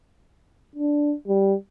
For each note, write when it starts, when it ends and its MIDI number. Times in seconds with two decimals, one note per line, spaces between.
0.76 1.15 62
1.28 1.54 55